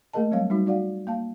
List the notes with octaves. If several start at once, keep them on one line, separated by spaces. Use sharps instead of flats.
A3 A#3 G#4 A#4 D#5 A5
F#3 G3 C4 C#5 E5 F5
G3 D#4 F#4
D#4 F#4 D5 F5 F#5
A#3 F5 A5